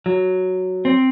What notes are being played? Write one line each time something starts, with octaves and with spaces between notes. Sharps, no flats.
F#3
C4